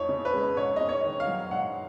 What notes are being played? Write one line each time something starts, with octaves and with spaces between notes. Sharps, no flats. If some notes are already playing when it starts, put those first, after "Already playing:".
Already playing: F2 D#4 C#5
C#3
B4
G#3
G#2 C#5
C#4 D#5
C#5
D#3
F5
F#3
G#2 F#5